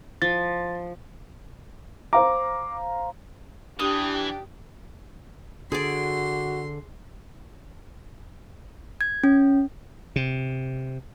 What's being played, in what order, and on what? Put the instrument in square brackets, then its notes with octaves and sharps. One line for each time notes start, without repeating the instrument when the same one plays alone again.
[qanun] F3 [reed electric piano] A6
[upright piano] C5 F5 A#5 [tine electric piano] D6
[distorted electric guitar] E3 [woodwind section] D4 [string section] G4 [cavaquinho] D#6
[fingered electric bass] D3 [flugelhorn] F#4 [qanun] G#4 D5 [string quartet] C6
[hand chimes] G#6
C#4
[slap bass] C3